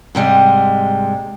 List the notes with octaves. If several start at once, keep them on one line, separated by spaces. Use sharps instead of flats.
G#2 C3 G3 G#3